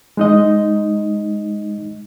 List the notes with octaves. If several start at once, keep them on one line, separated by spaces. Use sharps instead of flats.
G#3 D#4 D#5